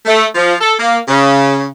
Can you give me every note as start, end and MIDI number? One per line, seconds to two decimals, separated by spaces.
0.06 0.25 57
0.35 0.54 53
0.61 0.72 69
0.80 0.98 58
1.08 1.67 49